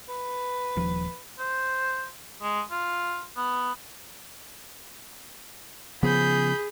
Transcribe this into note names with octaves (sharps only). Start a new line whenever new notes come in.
B4
D#1 F3
C5
G#3
F4
B3
C#3 F3 B3 G#4 B5 G6